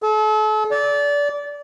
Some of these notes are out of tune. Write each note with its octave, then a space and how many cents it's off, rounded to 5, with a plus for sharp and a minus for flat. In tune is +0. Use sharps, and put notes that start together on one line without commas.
A4 -40
D5 -25